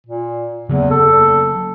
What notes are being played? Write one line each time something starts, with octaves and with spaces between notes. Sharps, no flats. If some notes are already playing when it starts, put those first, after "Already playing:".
A#2
E2 C#3 F#3 A#3
A4